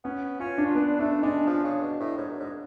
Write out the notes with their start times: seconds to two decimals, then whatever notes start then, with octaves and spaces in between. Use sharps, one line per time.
0.04 B3 C#4
0.40 C#4 F4
0.58 D4
0.66 F4
0.75 B3 D4
0.99 A3 D4
1.22 G#3 D4
1.47 F3
1.64 C#3
1.82 B2
2.00 A2
2.18 G#2
2.29 F#2
2.40 G#2